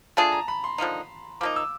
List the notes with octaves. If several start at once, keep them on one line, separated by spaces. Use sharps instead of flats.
A3 D4 F4 G#4 A5
A#5
B5
C6
D3 F3 A#3 D#4
F3 A#3 D#4 D6
E6